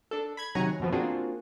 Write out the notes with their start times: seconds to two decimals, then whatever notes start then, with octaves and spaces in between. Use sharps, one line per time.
0.11 D4 A4
0.37 B5 G#6
0.55 C3 D#3 F#3 F#5 G#5 A#5
0.80 F#2 B2 F3
0.92 A#3 C4 D4 F4 F#4 G#4